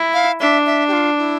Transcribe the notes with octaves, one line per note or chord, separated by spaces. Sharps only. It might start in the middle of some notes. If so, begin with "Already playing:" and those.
Already playing: E4
F5
D4 E5
E5
G4
F4
E4